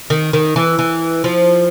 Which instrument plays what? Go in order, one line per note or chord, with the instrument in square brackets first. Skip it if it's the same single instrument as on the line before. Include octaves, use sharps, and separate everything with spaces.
[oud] D#3
D#3
E3
E3
F3